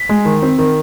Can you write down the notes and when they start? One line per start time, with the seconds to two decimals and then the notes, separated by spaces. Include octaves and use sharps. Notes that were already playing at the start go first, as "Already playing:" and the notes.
Already playing: B6
0.09 G#3
0.25 D#3
0.43 C4
0.58 D#3